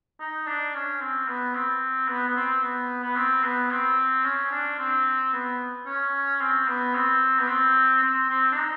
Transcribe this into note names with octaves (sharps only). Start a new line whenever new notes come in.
D#4
D4
C#4
C4
B3
C4
B3
B3
C4
B3
B3
C4
B3
C4
C#4
D4
C4
B3
C#4
C4
B3
C4
B3
C4
C4
C4
D4
D#4